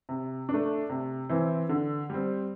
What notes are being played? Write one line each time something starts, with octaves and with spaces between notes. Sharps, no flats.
C3
D4
A3
C3
E3 C4 E4
D3
G3 C4